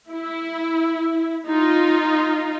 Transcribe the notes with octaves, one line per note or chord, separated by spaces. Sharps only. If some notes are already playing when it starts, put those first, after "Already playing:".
E4
D#4 F4